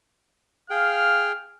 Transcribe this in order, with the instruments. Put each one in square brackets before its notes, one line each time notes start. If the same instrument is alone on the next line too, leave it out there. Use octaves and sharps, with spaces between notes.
[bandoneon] G#4 G5 [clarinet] F5 [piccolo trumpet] F6